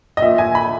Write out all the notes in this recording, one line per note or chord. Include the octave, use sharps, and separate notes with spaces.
D#5
A#2 E5
G#5
B5